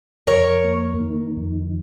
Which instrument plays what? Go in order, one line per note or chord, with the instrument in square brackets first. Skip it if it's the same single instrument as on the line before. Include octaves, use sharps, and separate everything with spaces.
[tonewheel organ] F2 [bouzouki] A#4 C#5
[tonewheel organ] A#3
D#3
F2